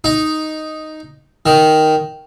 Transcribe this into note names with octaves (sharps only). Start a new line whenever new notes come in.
D#4
D#3